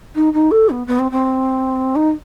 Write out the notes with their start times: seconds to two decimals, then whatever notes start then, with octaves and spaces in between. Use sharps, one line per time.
0.15 D#4
0.33 D#4
0.51 A4
0.70 B3
0.87 B3
0.99 C4
1.12 C4
1.96 D#4